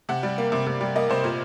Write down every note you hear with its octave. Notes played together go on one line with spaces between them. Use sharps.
C3 F#5
G3
A#3
C3
C3
G3
A#3 D#5
C3 C5
A#2 A#4